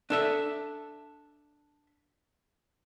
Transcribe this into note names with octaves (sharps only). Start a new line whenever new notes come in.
D4 A4 E5